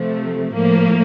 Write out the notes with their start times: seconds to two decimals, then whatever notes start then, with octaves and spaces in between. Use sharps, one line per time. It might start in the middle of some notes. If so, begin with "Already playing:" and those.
Already playing: C3 F3 A3
0.53 A2 F3 A#3